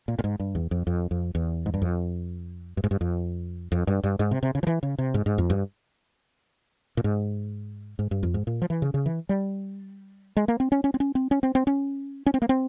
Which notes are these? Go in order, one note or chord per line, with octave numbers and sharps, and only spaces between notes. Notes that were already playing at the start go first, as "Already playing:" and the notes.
A#2
A#2
G#2
G2
E2
F2
F2
F2
E2
G#2
G2
F2
G2
G#2
G2
F2
F2
G2
G2
G#2
C3
C3
C#3
F3
E3
C#3
C3
G#2
G#2
F2
G2
A#2
G#2
G#2
G2
F2
G#2
A#2
F3
E3
C#3
C#3
E3
G3
G#3
A#3
C4
C#4
C#4
C4
C#4
C4
C#4
C4
C4
C#4
C#4
C4
A#3
C4